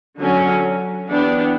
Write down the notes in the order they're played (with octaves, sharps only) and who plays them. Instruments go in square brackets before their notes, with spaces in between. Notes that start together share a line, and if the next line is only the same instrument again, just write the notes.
[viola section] D3 F#3 C#4
E3 B3 D4 G4